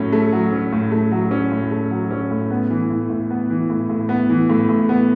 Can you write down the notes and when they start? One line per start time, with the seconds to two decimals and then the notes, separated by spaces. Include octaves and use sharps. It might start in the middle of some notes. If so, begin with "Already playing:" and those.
Already playing: A2 F#3 C#4
0.13 A3
0.32 F#3
0.53 C#4
0.72 A2
0.92 A3
1.12 F#3
1.31 C#4
1.52 A2
1.71 A3
1.91 F#3
2.11 C#4
2.31 A2
2.51 B3
2.70 E3
2.90 A2
3.10 A2
3.30 B3
3.50 E3
3.70 A2
3.89 A2
4.09 B3
4.29 E3
4.49 A2
4.69 A2
4.89 B3